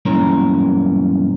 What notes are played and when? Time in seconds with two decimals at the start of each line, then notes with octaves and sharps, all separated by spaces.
0.05 B1 G2 E3 A#3 C#4 A#4